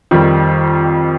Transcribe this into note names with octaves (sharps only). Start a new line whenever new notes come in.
F2 D#3 G3